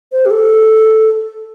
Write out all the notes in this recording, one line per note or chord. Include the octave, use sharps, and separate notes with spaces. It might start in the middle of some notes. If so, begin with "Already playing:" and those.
C5
G4
A4